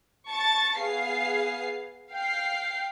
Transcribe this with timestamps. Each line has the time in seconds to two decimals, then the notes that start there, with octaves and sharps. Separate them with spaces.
0.28 A5 C#6 A6
0.79 B3 G#4 F5 C7
2.12 F5 G5 C7